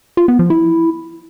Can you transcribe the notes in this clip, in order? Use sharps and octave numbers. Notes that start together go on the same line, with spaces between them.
F4
B3
F3
E4